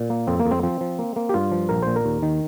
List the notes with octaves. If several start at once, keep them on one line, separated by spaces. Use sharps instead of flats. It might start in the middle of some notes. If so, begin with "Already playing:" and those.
Already playing: A#2
A#3
F2 C4
A#3
F2
C4
F3 C4
F3
A#3
A#3
G4
G2 F4
F3
A#1 A#4
A#2 C5
A#4
D#2
D#3